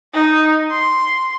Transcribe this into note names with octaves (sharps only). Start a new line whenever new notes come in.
D#4
C6